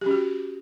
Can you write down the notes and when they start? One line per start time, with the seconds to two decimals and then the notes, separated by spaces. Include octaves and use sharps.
0.01 G4
0.06 C#4
0.11 F#4